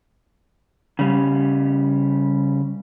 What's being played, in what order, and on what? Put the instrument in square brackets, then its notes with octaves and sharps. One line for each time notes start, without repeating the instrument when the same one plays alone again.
[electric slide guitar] C#3 G3